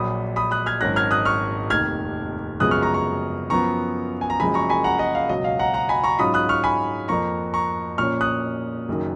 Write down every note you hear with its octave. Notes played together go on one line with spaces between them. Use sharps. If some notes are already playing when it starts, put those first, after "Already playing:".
Already playing: A#1 A#2 F#3 B5 D#6
B5 D#6
D#6 F#6
F6 G#6
G#1 G#2 F#3 C#4 F#6 A#6
F6 G#6
D#6 F#6
C#6 F6
F1 D#2 D#3 F6 G#6
F#2 C#3 F3 G#3 B3 D#6 F#6
C#6 F6
A#5 C#6
A#5 C#6
F#2 F3 B3 A#5 C#6
G#5
A#5
F#1 F#2 F3 G#3 G#5 B5
A#5 C#6
G#5 B5
F#5 A#5
D#5 F#5
F5
C#2 B2 F#3 D#5
F5
F#5 A#5
F#5 A#5
G#5 B5
A#5 C#6
G#2 F#3 C#4 F4 B5 D#6
D#6 F#6
C#6 F6
G#5 B5
F2 F3 A#3 A#5 C#6
A#5 C#6
A#2 F3 A#3 C#4 C#6 F6
D#6 F#6
F#1 F#2 D#3